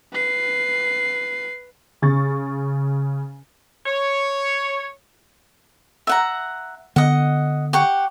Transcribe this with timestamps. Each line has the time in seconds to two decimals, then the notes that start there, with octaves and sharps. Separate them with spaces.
0.14 B4 C7
2.02 C#3 C#6 A6
3.86 C#5
6.07 E5 F#5 A#5
6.96 D3 B3 D#5 F#5
7.73 G4 F#5 C#6